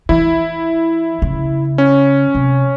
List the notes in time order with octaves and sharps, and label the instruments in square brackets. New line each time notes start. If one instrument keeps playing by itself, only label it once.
[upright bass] E3 [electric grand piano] E4
[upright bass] C#3
[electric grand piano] C#4
[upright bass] C3